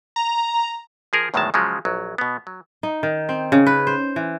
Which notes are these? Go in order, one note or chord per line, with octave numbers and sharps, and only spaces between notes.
A#5
F3 G#4 A#4
E2 A2 D#3 F#3 G#3 A5
C#3 F3 F#3 G#3 C#4
A#1 F#3
B2 B3
F#3
D#4
D#3
C4
C#3
B4
C5
E3